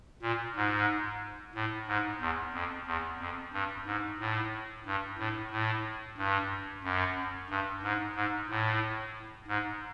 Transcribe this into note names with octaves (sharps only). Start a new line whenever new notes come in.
A#2
G#2
A2
G#2
E2
F2
E2
F2
G2
G#2
A2
G2
A2
A2
G2
F#2
G2
G#2
G#2
A2
G#2